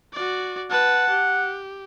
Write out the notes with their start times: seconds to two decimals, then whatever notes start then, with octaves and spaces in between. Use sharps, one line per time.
0.13 F#4 D5
0.71 B4 F#5 A5
1.10 G4